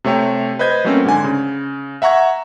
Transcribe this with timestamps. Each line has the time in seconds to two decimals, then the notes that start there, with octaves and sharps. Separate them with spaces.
0.04 C3 A3 C#5 G5
0.59 B4 C5 D#5 G6 G#6
0.84 F#3 A3 A#3 C4 C#4
1.04 G#2 D3 G#5
1.24 C#3
2.02 E5 F#5 A#5 C#6 G#6